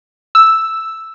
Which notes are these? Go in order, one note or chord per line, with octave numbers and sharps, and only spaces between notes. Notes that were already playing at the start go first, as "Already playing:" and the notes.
E6